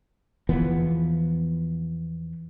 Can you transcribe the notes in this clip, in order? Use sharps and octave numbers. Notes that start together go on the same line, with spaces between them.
E2 E3 F3 B3